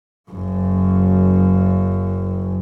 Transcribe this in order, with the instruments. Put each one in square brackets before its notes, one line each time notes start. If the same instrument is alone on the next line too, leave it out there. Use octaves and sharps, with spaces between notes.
[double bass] F#1 F#2